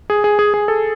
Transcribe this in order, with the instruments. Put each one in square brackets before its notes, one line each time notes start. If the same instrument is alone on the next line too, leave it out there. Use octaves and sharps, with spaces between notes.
[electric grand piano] G#4
G#4
G#4
G#4
A4